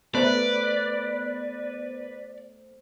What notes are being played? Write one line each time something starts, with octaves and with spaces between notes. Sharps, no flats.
A3 B3 B4 C5 D5